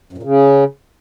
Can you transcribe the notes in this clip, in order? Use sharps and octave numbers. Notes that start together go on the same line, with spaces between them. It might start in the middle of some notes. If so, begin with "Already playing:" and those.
F#2
A#2
C#3